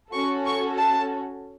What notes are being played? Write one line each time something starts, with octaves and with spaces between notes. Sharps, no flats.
C#4 F#4 A4 C#6
C#6
A5